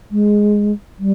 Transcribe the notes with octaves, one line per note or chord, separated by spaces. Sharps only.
G#3
G3